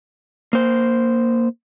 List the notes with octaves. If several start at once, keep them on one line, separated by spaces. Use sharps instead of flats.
A#3 C5